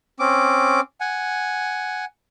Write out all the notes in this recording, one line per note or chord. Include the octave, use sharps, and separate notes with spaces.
C4 C#4 D6
F#5 G#5